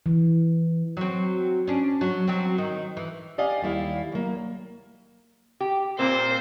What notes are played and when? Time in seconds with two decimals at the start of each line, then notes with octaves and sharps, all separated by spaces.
0.06 E3
0.97 F#3 C4
1.67 C#4 D4
2.01 F#3
2.28 F#3 C4
2.58 D#3
2.97 E3
3.38 G4 D5 D#5 F5 G#5
3.62 D#2 G3 E4 F5
4.12 F#3 A#3
5.60 G4
5.99 A#2 A#3 C4 C5